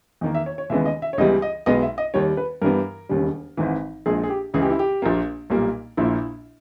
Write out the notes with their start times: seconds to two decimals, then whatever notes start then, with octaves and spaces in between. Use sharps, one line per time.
0.21 E2 D#3 A#3 D#5
0.35 E5
0.46 C#5
0.58 C#5
0.70 D#2 C#3 E3 G#3 B3 E5
0.86 D#5
1.02 E5
1.13 C#5
1.18 C#2 C#3 E3 G3 B3 D#5
1.42 D#5
1.66 B1 B2 G#3 B3 D#5
1.82 E5
1.98 D#5
2.14 D#2 D#3 G3 C#5
2.37 B4
2.62 G2 E3 G3 B3 A#4
3.09 E1 D#2 C#3 G3
3.57 G#1 G#2 E3
4.06 A#1 A#2 G#3 G#4
4.24 G#4
4.30 G4
4.54 C#2 C#3 E3 G#4
4.62 G4
4.70 E4
4.79 G4
5.02 A#1 A#2 A#3
5.50 B1 A#2 G3 A#3
5.97 A#1 A#2 A#3 E4